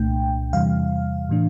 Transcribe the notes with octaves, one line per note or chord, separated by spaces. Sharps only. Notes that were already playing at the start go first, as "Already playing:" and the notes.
Already playing: C2 A#2 A3 D4 G5
E2 C3 E3 G3 F5
A2 E3 A3 D4